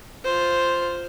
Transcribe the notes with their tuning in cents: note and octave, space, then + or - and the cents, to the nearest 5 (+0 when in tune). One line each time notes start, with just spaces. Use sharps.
F4 +0 C5 +0